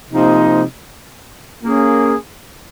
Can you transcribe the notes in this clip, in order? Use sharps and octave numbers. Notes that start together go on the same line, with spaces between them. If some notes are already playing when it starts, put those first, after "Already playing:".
C3 F3 A#3 D#4
A#3 C#4 G#4